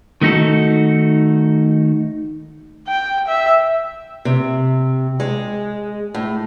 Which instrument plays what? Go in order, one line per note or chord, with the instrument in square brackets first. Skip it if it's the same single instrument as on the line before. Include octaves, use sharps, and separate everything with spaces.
[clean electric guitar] D#3 A3 D#4 F#4 A4
[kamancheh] G5
E5
[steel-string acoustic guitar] C3
G#3
A2